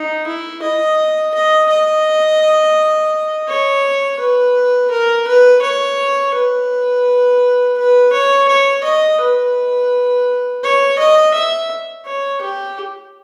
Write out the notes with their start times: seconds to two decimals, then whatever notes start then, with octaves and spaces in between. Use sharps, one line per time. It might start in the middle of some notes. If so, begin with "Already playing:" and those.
Already playing: D#4
0.27 E4
0.62 D#5
1.34 D#5
1.70 D#5
3.48 C#5
4.19 B4
4.91 A#4
5.27 B4
5.62 C#5
6.34 B4
7.78 B4
8.13 C#5
8.48 C#5
8.84 D#5
9.20 B4
10.63 C#5
10.99 D#5
11.34 E5
12.06 C#5
12.42 G4